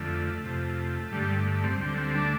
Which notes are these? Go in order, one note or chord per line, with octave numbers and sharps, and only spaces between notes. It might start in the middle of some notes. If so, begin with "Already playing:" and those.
Already playing: F2 D3 A3
F2 C3
G2 D3 G3
A3
A3
G3 C4
D2 D3 G3 C4
G3 C4
A3 D4